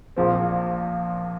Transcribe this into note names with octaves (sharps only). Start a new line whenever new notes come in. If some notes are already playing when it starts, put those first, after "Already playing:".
A#1 A#2 F3 C4